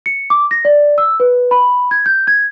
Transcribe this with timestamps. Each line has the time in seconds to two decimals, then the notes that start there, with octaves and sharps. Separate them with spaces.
0.06 C#7
0.30 D6
0.51 A#6
0.65 D5
0.98 E6
1.20 B4
1.51 B5
1.91 G#6
2.06 G6
2.27 G#6